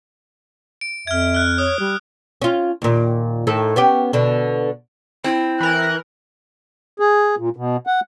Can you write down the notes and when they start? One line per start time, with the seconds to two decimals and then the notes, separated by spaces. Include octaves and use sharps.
0.81 D7
1.07 F2 E5 F6 G#6
1.35 F6 F#6
1.58 C#5 D#6
1.80 G3
2.42 C#4 F4
2.82 D#2 A#2
3.47 A2 D#3 A4
3.76 B3 C#4 G4
4.13 B2 D3
5.24 C4 E4
5.60 E3 A#4 F#6
7.00 G#4
7.38 A#2
7.56 B2
7.87 F#5